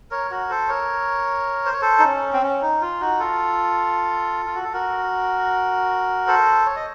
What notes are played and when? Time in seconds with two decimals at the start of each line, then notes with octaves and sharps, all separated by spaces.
0.11 A#4 C#5
0.31 F#4 A#4
0.50 A4 C5
0.69 A#4 C#5
1.66 C5
1.73 C#5
1.81 A4 C5
1.99 D#4
2.04 C#4
2.33 C4
2.42 C#4
2.62 D#4
2.81 F4
3.01 D#4 F#4
3.20 F4 A4
4.46 F4
4.55 F#4
4.64 A4
4.73 F#4 A#4
6.27 A4 C5
6.65 C#5
6.76 D#5